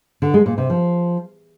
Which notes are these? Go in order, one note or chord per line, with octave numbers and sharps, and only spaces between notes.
D3
G#3
A#2
C3
F3